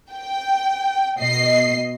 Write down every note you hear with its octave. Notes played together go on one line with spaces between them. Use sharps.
G5
B2 D#5 C7